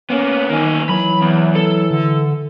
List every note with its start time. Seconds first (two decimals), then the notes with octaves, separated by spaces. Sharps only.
0.10 A#3 B3 C#4
0.49 D#3 A#3 C#4
0.89 E3 F#3 B5
1.21 E2
1.55 A4
1.91 D3